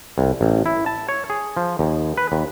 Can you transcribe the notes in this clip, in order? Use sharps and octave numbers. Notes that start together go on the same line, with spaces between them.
C2
A1
E4
A5
C#5
G#4
F3
D#2
B4
D#2